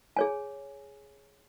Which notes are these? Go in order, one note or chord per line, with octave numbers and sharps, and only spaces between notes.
G#4 C#5 G#5